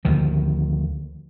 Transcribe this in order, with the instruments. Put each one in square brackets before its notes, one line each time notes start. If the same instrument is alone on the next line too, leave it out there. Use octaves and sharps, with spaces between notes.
[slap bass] D2 D#3 F3